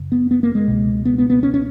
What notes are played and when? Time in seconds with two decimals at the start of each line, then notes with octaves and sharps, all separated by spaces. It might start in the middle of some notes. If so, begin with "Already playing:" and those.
Already playing: F#2 C#3
0.12 B3
0.31 B3
0.43 A#3
0.55 G#3
0.68 C#2 B2
1.05 B3
1.18 B3
1.30 B3
1.43 C#4
1.54 C#4